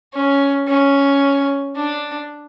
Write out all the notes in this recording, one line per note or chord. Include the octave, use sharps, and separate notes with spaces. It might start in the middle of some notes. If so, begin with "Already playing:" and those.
C#4
C#4
D4